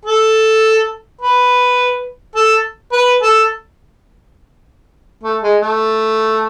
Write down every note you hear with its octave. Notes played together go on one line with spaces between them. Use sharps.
A4
B4
A4
B4
A4
A3
G#3
A3